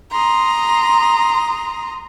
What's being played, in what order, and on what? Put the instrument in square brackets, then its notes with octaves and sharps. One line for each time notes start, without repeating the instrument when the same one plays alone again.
[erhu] A#5 [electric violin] C6 D#6